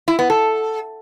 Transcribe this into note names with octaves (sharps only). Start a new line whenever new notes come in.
E4
B3
A4